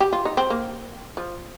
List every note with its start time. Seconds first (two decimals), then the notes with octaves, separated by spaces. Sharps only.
0.00 G4
0.13 F4
0.25 D#4
0.37 C4
0.50 A#3
1.17 F3